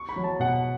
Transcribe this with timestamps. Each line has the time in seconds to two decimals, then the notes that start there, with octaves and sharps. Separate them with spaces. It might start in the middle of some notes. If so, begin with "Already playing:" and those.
Already playing: C#6
0.09 B5
0.16 F#3
0.24 A5
0.40 B2 F#5